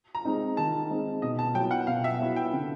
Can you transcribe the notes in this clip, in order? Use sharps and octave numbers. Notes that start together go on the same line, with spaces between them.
A#5
G#3 C4 D#4
D#3 A5
G#3 C4 D#4
B2 D#5
A5
F#3 B3 E4 G5
F#5
B2 F5
E5
F#3 B3 E4
G5
D3